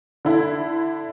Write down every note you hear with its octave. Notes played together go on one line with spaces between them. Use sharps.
D3 E4